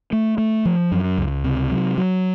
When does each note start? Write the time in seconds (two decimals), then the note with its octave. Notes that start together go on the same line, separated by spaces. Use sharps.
0.13 A3
0.38 A3
0.65 F3
0.92 F#2
1.18 C#2
1.44 C3
1.71 F#3
1.98 F#3